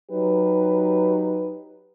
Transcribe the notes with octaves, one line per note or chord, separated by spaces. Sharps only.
F#3 D#4 G4 B4